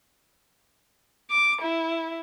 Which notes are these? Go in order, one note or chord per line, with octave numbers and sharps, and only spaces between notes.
D6
E4